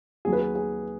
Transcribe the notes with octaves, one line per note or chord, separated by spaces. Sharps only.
D#2 D#3 F#3 G#4
B4
G#4
G#4